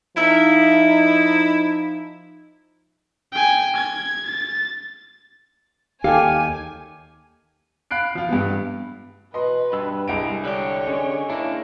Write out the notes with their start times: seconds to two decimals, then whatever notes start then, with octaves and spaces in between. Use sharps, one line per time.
0.17 F3 D#4 E4 A#4 E5
3.32 G5 G#5
3.76 G#6
4.26 A6
6.04 D#2 G4 A4 F5 G#5
7.91 F5 B5 F#6 C7 D7
8.15 F3 F4
8.29 G2 B3
9.34 B2 B4 D#5 C6
9.73 G2 E6
10.08 C2 G#3 D7
10.45 D3 D4 G4 C#5
10.87 G#3 C#4
11.30 A#3 D4 E4